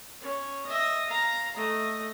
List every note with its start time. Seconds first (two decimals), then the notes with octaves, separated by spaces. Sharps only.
0.21 C#4
0.66 D#5 E5
1.08 F5 A#5
1.56 A3 D#5